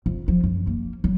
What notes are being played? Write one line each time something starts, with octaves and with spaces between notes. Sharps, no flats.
F2
F3
F#2
A#3
F#3